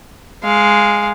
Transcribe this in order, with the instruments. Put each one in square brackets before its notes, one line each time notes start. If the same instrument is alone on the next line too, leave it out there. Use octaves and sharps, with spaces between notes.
[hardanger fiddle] G#3 F5